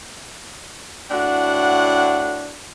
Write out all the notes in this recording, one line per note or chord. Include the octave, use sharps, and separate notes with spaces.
A2 D4 F#4 F#5